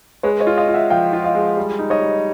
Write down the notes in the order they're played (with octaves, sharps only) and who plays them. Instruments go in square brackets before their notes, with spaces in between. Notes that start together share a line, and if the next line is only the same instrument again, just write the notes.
[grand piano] G#3 [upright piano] B4 C#5
[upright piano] C#5 D#5
[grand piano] F4
[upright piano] D#5 F5
[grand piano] F4
[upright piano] E5 F#5
[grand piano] F3 [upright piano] F5 G5
[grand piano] F4
[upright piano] D#5 F5
[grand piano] G#3
G3
D#4
[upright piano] C#5 D#5
[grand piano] G3